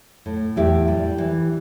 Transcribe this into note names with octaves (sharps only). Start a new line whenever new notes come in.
A2
E2 E4 G4
G3
E3